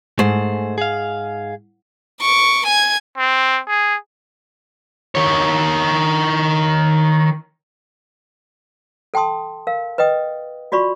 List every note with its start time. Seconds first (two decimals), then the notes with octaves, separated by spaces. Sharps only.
0.19 G#2 A3 G#4 C5
0.78 G#4 F5
2.21 C#6 D6
2.66 G#5 G#6
3.18 C4
3.68 G#4
5.15 D#3 C#5
9.14 A4 G5 A5 C6 D#6
9.67 A#4 F5
9.98 B4 D#5 G5 D#6
10.72 F4 F#4 D5 B5 C#6